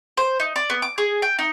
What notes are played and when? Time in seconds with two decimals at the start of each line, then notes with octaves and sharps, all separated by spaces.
0.17 C5
0.40 D#4
0.56 D5
0.70 B3
0.82 D6
0.98 G#4
1.22 G5
1.39 D#4